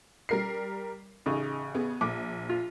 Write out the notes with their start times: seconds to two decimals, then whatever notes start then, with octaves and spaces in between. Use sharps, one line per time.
0.29 G3 A#4 C7
1.26 A1 C#3 D#4
1.75 B3 G#4
2.01 A#1 D6
2.49 F4